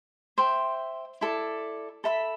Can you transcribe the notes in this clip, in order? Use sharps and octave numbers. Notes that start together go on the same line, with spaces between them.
C5 E5 G5
E4 A4 D5
A4 E5 B5